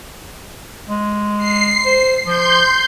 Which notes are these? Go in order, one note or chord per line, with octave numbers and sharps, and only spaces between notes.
G#3
C7
C5
F3 C6 G6